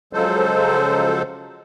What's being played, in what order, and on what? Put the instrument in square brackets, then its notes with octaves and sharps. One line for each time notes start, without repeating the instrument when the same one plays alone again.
[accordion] C#3 F3 F#3 G#3 A4 C5